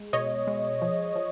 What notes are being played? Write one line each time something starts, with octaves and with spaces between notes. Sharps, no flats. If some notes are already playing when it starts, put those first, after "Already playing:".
Already playing: G#3
B2 C#5 D#5
G#3
F3
F3